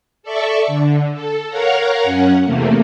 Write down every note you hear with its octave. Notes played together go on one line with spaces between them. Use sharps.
A4 D5 E5 C#6
D3
A4
A#4 C#5 F5 F#5 A#5
F#2 C#4 F#5
E2 C3 A3 A#3